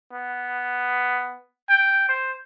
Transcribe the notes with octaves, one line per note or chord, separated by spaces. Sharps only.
B3
G5
C5